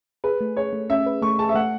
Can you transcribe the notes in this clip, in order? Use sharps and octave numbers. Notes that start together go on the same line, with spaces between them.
G#4 B4
A3
G#4 C#5
A3
C#4 E5
B4
A3 C#6
G#4 A5
E5
A3 F#5